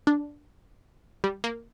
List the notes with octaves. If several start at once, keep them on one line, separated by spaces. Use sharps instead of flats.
D4
G3
A#3